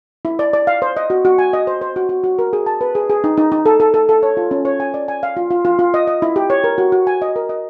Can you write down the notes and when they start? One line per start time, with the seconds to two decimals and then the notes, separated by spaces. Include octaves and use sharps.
0.25 E4
0.39 D5
0.53 D5
0.67 F5
0.82 C5
0.97 D#5
1.10 F#4
1.25 F#4
1.38 G#5
1.53 D#5
1.67 C5
1.81 C5
1.96 F#4
2.09 F#4
2.24 F#4
2.39 A#4
2.53 G#4
2.66 A5
2.81 B4
2.95 G#4
3.10 G#4
3.24 D#4
3.38 D#4
3.52 D#4
3.66 A4
3.80 A4
3.94 A4
4.09 A4
4.23 C#5
4.37 F4
4.51 C#4
4.65 C#5
4.80 G#5
4.94 D5
5.08 G#5
5.23 F5
5.37 F4
5.51 F4
5.65 F4
5.79 F4
5.94 D#5
6.07 D#5
6.22 E4
6.36 G4
6.50 C#5
6.64 A#4
6.78 F#4
6.92 F#4
7.07 G#5
7.22 D#5
7.36 A#4
7.49 D#5